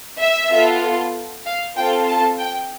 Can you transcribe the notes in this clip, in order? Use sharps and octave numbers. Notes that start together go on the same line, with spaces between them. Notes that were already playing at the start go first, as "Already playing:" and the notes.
E5
B3 F4 A4
F5
C4 F4 A4 G5
A5
G5